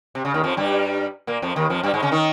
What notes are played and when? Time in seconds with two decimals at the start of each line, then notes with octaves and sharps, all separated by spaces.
0.15 C3
0.25 C#3
0.34 D#2 D#3
0.44 F2 F3
0.57 G2 G3
1.27 A#2 A#3
1.42 F2 F3
1.56 D#2 D#3
1.70 F2 F3
1.83 G2 G3
1.94 G#2 G#3
2.02 C#3 C#4
2.12 D#3 D#4